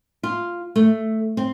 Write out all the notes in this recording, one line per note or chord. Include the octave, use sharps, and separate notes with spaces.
F4
A3
C4